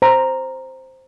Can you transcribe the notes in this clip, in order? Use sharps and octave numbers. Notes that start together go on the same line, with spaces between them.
C5 A#5